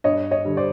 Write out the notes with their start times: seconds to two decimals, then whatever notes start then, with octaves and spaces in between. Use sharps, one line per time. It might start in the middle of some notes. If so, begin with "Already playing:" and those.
0.04 G2 C#5 D#5
0.31 C#5 D#5
0.45 D3 G3
0.57 C5 D5